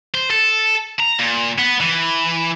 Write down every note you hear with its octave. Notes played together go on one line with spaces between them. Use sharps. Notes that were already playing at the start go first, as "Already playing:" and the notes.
C5
A4
A#5
A#2
B3
E3